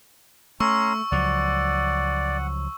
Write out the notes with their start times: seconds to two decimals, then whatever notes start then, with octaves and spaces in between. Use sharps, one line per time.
0.60 A3 C#4 A#5 C6 C#6 E6
1.12 C#2 F3 F#3 D5 F#5